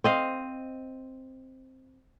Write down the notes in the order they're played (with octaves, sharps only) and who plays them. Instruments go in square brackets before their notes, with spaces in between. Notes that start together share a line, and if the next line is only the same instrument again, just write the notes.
[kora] C4 D#5 F5